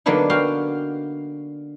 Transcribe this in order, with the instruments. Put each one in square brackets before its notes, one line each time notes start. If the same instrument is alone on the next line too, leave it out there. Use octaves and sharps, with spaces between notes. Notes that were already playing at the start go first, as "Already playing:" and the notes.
[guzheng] D3 F#3 A#3 B3 D4 D#4
F#4 F5 G5